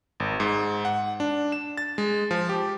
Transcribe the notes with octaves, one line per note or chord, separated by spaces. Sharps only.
G#1
G#2
F#5
D4
E7
A6
G#3
F3
G4